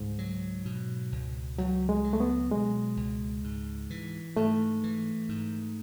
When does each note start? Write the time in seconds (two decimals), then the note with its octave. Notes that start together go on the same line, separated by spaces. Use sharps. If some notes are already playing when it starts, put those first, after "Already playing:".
Already playing: C#2 G#2
0.19 F#3
0.65 B2
1.12 C#2
1.58 C#2 F#3
1.89 G#3
2.04 F#3
2.13 A3
2.20 B3
2.51 B2 G#3
2.97 C#2
3.44 G#2
3.90 E3
4.36 G#2 A3
4.83 E3
5.29 G#2